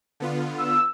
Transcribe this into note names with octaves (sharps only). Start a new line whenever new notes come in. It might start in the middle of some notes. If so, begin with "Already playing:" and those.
D3 B3 F4
E6